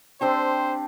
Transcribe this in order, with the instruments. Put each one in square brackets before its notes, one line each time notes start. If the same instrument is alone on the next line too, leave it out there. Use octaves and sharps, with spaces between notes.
[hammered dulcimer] C4 D4 G4 [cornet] C5